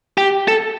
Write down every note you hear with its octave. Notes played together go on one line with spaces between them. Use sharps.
G4
A4